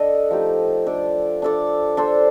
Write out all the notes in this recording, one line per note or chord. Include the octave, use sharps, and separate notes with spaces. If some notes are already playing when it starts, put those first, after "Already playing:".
Already playing: D4 A4 D#5
F3 A3 D#4 G4
D4 A4 D5
D4 A4 D5
D4 A4 C5